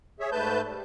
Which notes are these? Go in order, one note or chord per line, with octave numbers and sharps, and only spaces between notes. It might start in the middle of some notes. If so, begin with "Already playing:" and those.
G#4 C#5 E5
G#2 A3 B4 A5 G6
G3